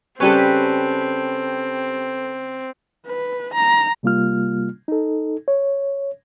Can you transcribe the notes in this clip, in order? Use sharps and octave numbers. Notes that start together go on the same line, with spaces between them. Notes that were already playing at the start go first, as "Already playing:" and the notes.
C#3 G3 C4 C#4 G4 A4 B4 C#5
B4
A#5
C3 G3 A#3 F4 F6
D#4 A4
C#5